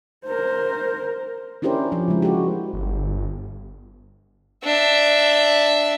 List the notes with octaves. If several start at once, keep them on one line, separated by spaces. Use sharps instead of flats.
A#4 C5
C#4 D4 E4 G4 A#4 C5
F3 E4
C#3 G#3
F#4 G4
G1
D4 E5